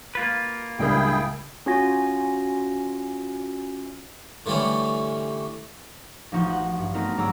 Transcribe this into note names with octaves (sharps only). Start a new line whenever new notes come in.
A#3 F4 B4
C#2 A2 G3 D4 E4 G#4 A#4 G5
C#4 F4 F#4 G#5 A#6
D3 E3 G3 A3 C#4
A1 F3 D#4 F#4 C#6 G6
F#5
G2
A3 B3 C4 D#4 F#4 A#4
G#2 F#3 G3 A#5 D6 E6